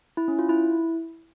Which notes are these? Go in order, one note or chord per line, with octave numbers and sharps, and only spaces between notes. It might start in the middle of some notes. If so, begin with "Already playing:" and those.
E4
C#4
F4
E4